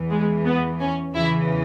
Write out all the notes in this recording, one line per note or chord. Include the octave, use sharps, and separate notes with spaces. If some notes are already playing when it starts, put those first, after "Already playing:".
Already playing: E2 E3
G#3
B3
C#4
E2 C#3 E3 E4